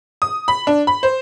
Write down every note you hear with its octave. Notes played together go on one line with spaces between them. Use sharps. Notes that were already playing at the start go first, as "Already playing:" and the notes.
D#6
B5
D4
B5
C5